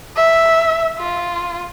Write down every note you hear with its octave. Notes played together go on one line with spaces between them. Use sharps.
E5
F4